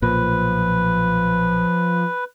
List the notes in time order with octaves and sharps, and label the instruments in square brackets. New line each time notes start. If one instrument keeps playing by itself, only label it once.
[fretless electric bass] B1 A#2 A#3 [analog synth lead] F3 [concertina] B4